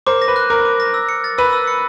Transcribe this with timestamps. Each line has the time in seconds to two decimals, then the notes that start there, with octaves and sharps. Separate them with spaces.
0.07 A#4 C5 D6
0.22 A#6
0.28 B4
0.36 F#6
0.50 A#4 D6
0.65 D6
0.80 A#6
0.94 E6
1.09 C#7
1.24 A6
1.38 B4 E6
1.53 E6
1.67 C#7